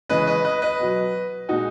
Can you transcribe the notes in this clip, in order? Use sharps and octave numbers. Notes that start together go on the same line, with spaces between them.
C#3 E3 G#3 B4 D#5
B4 D#5
B4 D#5
B4 D#5
B2 F#3
A#2 G#3 D#4 F#4